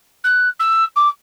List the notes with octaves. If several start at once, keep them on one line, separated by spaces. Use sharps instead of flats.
F#6
E6
D6